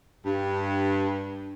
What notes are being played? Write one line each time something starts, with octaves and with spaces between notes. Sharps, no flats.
G2